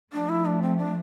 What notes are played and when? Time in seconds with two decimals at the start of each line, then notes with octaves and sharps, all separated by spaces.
0.13 F3 A3 D4
0.29 E4
0.46 D4
0.62 C4
0.78 D4